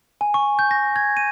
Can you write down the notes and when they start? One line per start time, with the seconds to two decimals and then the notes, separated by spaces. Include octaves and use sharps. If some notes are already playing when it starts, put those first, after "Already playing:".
0.21 G#5
0.34 C#6
0.59 G6
0.71 A#6
0.96 G#6
1.17 D#7